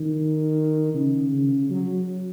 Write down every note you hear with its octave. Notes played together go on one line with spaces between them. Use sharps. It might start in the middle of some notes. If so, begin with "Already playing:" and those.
Already playing: D#3
C#3
C#3
F#3